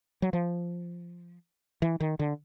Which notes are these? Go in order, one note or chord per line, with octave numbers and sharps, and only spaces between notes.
F#3
F3
E3
D#3
D3